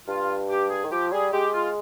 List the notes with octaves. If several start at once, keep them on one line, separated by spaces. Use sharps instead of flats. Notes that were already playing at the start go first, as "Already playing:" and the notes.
G2 F4
G4
G#4
D#3
F3 G4
G3 G#4
G#3 G4
F4